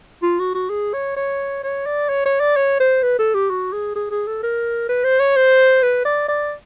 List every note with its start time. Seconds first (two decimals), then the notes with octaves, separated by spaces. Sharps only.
0.23 F4
0.39 F#4
0.55 F#4
0.70 G#4
0.94 C#5
1.16 C#5
1.64 C#5
1.86 D5
2.09 C#5
2.25 C#5
2.40 D5
2.56 C#5
2.80 C5
3.03 B4
3.19 A4
3.34 G4
3.50 F#4
3.73 G#4
3.95 G#4
4.11 G#4
4.27 A4
4.43 A#4
4.89 B4
5.04 C5
5.19 C#5
5.36 C5
5.82 B4
6.05 D5
6.28 D5